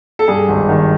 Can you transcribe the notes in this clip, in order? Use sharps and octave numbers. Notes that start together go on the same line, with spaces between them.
A4
G2 G#4
G#1
D#3